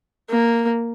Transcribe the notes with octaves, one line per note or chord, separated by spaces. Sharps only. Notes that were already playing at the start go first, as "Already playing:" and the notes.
A#3